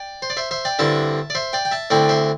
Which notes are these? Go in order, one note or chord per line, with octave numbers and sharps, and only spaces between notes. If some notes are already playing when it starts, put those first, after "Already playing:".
Already playing: D5 G5
C5
D5
C5 E5
C5 E5
D5 G5
G2 D3 C4 E4 E5 A5
D5
C5 E5
D5 G5
G5
E5 A5
D2 D3 C4 E4 D5 G5
C5 E5